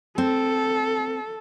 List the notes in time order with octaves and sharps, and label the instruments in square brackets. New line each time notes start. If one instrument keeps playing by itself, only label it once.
[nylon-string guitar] C4 [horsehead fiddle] A4